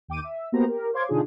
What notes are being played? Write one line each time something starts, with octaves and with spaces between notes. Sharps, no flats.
D#2 G5 D6 D#7
E5
A#3 B3 F#4 G4 C5 A#5
G4 A#4
C5 C#5 F5 C6 D6 G#6
B2 D3 D4 D#4 F4 G#4